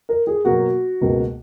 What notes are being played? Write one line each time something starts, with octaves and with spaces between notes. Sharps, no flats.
A#4
G#4
B2 F#3 A#3 F#4
C#2 B2 A#3